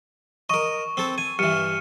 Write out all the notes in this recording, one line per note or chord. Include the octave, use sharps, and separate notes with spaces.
A#4 D#5 C#6
C4 A4
G#5
G2 E3 F6 C#7 D#7